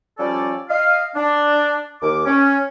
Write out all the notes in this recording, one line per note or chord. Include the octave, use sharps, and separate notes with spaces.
F3 G3 C#4 A4 D5
D#5 F5
D4
D#2 D6
C#4